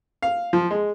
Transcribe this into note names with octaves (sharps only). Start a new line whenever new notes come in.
F5
F3
G#3